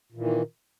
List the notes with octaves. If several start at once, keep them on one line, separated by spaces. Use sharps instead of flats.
A#2 D#3 E3